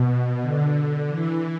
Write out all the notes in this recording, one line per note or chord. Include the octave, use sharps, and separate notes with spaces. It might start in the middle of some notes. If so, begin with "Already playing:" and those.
Already playing: B2
D3
E3